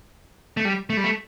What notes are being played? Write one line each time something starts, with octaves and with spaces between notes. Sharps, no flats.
A3
G3
A3
G3
A3